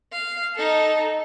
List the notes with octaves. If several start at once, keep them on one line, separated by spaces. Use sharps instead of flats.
F5
D#4 A4